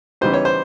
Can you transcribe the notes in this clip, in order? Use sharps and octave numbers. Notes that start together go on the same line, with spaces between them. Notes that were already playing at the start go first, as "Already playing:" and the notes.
C#3 E3 G3 B3 D#4 C5
C#5
C5